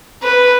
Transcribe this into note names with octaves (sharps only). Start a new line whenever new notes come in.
B4